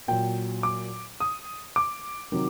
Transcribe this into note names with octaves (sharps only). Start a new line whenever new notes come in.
A#2 F#3 G5
D6
D#6
D6
C3 D#3 F#3